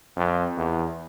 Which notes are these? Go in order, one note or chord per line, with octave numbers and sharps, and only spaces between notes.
F2
E2